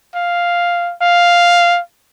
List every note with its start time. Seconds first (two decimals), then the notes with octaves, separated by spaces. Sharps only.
0.15 F5
1.02 F5